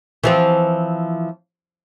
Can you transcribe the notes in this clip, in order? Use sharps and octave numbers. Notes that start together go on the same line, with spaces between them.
E3 F3 C4